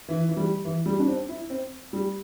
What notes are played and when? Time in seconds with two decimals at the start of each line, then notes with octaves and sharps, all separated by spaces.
0.08 E3
0.29 E3
0.37 G3
0.65 E3
0.86 G3
1.00 D4
1.08 C4
1.28 E4
1.50 C4
1.93 G3